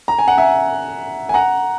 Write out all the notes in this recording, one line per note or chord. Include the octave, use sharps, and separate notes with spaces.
A#5
G#5
F#5
E5 G#5
G#5
F#5 A#5